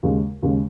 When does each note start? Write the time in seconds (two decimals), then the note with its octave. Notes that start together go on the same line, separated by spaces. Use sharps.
0.03 D#2 C#3 G#3
0.42 D#2 C#3 G#3